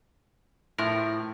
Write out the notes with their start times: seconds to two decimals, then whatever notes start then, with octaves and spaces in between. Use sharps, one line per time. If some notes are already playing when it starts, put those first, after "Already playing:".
0.78 A2 F3 A#4